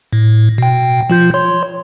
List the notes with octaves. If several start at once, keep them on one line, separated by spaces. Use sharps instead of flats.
A2
B2 G5
F3 F4 G6
C#5 C6